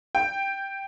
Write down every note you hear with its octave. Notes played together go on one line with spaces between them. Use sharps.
G5